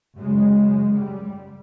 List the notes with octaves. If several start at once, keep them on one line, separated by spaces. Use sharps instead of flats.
F#2 C#3 G#3
G3